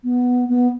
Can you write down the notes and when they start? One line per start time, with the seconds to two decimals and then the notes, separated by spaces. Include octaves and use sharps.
0.04 B3
0.49 B3